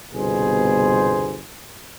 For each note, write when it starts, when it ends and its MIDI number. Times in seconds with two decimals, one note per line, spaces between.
0.14 1.39 31
0.14 1.39 36
0.14 1.39 47
0.14 1.39 68
0.14 1.39 72